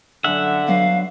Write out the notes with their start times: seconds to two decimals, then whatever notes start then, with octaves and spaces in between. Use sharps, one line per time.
0.24 F#2 D3 A4 E5 F#5 G#5
0.67 F#3 B3 D4 F5